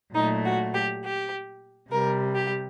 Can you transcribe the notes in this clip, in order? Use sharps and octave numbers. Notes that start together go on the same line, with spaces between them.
A#2 F#3 A3 D#4
F#4
G4
G4
C3 G3 A#4
G4